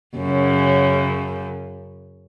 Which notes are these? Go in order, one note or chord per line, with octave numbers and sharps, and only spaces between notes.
F#2 C#3